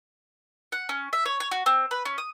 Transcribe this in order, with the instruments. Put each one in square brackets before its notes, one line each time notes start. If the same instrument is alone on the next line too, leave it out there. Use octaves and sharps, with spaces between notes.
[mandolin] F#5
C#4
E5
C#5
C#5
F#4
C4
B4
C#4
D#6